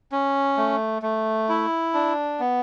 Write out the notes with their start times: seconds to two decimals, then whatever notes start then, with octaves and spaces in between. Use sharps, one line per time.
0.12 C#4
0.57 A3
1.02 A3
1.49 E4
1.94 D4
2.40 B3